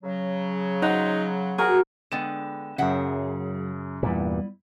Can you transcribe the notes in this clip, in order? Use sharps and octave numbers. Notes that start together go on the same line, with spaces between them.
C#3 F#3
D#4 F#5 C6
F#4 G#4 A#4
D3 G#3 B3 G5 E7
F#2 C#3 F#3 G#4 E5 F#5 G5
E2 G2 A#2 G3 B3 E4